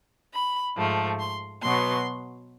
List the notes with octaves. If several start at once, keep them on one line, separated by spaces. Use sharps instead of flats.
B5
G#2 F3 A3
C6
B2 F#3 B3 C6